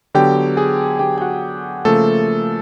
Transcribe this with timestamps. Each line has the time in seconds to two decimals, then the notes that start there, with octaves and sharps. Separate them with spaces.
0.15 D3 F#3 B3 G4 G5
0.57 G#4 G#5
0.99 D3 F#3 B3 G4 G5
1.18 G5
1.21 F#4 F#5
1.85 C#3 F3 A3 A#3 A4